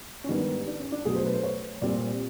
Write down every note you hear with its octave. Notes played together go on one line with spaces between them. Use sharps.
C#4
G#2 D#3 G3 B3 D4
D4
C#4
D4
B2 F#3 A3 G#4
C5
B4
C5
C#5
A#2 G3 C4 D5